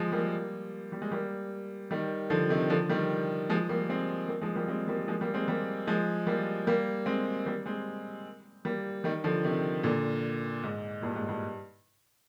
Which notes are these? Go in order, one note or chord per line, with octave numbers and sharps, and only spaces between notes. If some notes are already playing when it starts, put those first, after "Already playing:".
Already playing: F3 G#3
G3 A#3
G3
G#3
G3 A#3
D#3 G3
D3 F3
C3 D#3
D3 F3
D#3 G3
F3 G#3
G3 A#3
G#3 C4
G3 A#3
F3 G#3
G3 A#3
G#3 C4
G3 A#3
F3 G#3
G3 A#3
G#3 C4
G3 A#3
F3 G#3
G3 A#3
G3 A#3
G#3 C4
G3 A#3
G#3 C4
G3 A#3
D#3 G3
D3 F3
C3 D#3
A#2 D3
G#2
G2 A#2
G#2
G2